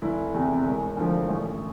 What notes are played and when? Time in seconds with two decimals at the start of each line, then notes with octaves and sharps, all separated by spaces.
0.02 F1 E4
0.34 E2 C3
0.66 E1
0.97 D2 D3 F3
1.29 A1